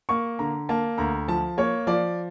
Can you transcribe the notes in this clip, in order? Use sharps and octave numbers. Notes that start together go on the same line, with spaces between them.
A#3 C#6
D3 A#5
A#3 A5
D2 A#5
F3 A5
A#3 C#5
F3 D5